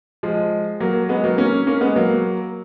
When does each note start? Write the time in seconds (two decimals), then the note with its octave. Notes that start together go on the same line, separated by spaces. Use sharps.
0.23 F3 G#3
0.80 F#3 A#3
1.09 G#3 B3
1.24 F#3 A#3
1.38 A#3 C#4
1.67 A#3 C#4
1.81 G#3 B3
1.96 F#3 A#3